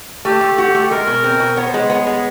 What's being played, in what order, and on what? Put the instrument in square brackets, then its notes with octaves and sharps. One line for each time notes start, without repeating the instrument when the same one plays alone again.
[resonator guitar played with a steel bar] A3 [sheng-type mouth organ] G4
[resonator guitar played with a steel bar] A3
F#4
A3
[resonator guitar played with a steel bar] G#3 [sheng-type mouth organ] A#4
[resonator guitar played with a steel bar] B2
C4
B2
[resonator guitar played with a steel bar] B3 [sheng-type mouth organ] C#5
[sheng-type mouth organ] C5
[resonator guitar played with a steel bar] G#3 [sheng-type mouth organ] C#5
[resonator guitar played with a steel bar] B3
G#3